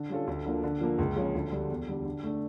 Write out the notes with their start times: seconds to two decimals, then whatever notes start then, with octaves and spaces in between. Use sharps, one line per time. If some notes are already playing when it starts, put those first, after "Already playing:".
Already playing: D3
0.10 G3 C#4 F4 A4
0.27 D2
0.46 D3 F3 A#3
0.64 D3
0.81 F3 A#3
0.98 C#2
1.16 C#3 F3 C#4
1.35 D2
1.52 D3 G3
1.70 E2
1.88 D3 G3
2.05 D3
2.23 A3 D4